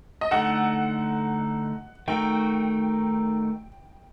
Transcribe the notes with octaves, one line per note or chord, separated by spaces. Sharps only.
D#5
D3 A3 D#4 A4 F#5
D#3 A3 D#4 F#4 G5